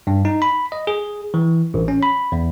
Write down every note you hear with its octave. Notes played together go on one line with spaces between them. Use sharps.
G2
D#4
B5
D#5
G#4
E3
A1
C#4
B5
E2